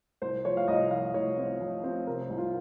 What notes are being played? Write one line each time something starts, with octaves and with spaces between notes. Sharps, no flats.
C2 C5
F3 C#5
F5
C2 D#5
F3 F5
C2 C#5
C4
F3
C4
C3 A#4
C2
F4